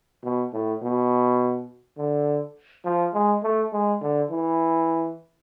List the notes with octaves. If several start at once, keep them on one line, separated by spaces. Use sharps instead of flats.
B2
A2
B2
D3
F3
G#3
A3
G#3
D3
E3